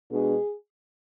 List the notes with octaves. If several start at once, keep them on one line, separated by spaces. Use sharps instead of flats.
B2 G#3 D4 G#4